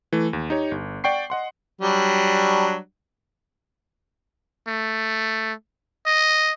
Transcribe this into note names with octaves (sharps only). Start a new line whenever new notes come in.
E3 A3
D#2
D#4 G4 C#5
G1
D5 F#5 G5 C#6 C7
D#5 F#5 C6
F#3 G3 D4
A3
D#5